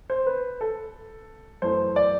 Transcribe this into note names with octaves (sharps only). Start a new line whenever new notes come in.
C5
B4
A4
F#2 E3 A3 C5
D5